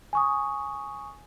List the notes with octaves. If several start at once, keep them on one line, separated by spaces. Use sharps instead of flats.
G#5 C#6 D#6